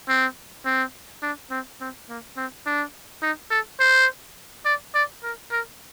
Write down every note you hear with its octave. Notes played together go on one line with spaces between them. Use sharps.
C4
C4
D4
C4
C4
A#3
C4
D4
D#4
A4
C5
D5
D5
A#4
A#4